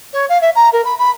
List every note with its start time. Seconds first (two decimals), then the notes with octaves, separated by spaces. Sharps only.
0.13 C#5
0.29 F5
0.41 E5
0.56 A#5
0.73 A#4
0.84 B5
0.99 B5